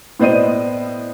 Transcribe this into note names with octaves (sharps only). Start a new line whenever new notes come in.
A2 B3 C5 D5 D#5 D#7